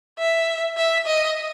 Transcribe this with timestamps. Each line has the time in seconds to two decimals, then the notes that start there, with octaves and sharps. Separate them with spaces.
0.19 E5
0.77 E5
1.06 D#5